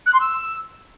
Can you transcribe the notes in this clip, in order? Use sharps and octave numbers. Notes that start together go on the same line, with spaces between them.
F#6
C6
E6